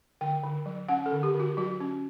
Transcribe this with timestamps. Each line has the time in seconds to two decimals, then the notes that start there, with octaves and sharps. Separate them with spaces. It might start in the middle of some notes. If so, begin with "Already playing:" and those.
0.21 D3 G5
0.43 D3
0.66 F#3
0.89 C#4 F#5
1.06 A4
1.12 D3
1.23 G4
1.35 D3
1.40 F#4
1.57 F#3 F#4
1.81 C#4